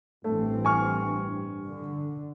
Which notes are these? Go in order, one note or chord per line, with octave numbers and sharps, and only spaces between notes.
A1 G2 E3 A3 C4
G#5 C#6 F6
D3